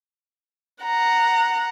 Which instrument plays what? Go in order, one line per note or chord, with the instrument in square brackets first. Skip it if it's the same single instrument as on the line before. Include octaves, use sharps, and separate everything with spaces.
[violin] F#5 A#5